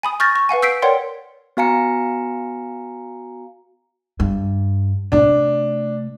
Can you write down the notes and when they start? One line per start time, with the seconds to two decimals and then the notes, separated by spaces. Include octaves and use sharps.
0.03 G#5 B5 D#6
0.20 C#6 F6 G6 A6 A#6
0.36 C#6
0.49 B4 F5 F#5 G#5
0.62 E6 G6 B6 C7 D7
0.82 A#4 C#5 D5 F#5 G5 C6
1.57 B3 F#4 F5 G#5 A#5 C#7
4.20 G2
5.12 C3 A3 D4